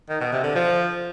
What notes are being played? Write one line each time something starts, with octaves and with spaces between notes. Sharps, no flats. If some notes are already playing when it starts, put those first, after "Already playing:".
D#3
B2
C3
D3
F3